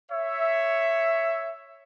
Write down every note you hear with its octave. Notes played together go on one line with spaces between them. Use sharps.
C#5 E5